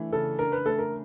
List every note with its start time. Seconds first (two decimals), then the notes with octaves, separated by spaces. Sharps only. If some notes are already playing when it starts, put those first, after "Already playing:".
Already playing: E3 A3 D4
0.13 C#3 A4
0.39 D4 A#4
0.52 B4
0.65 A3 A4
0.79 A#4